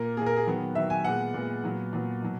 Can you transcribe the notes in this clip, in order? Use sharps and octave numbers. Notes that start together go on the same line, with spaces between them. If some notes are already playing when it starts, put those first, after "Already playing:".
Already playing: A#2 A#3 A#4
A#2 A#3 G#4
A#4
G#4
D#3 F#3 B3
D#3 F#3 B3 E5
G#5
A#2 G#3 B3 F#5
A#2 G#3 B3
A#2 F#3 B3
A#2 F#3 B3
B2 F#3